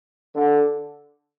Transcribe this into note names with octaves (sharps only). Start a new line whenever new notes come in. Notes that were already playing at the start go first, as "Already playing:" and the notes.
D3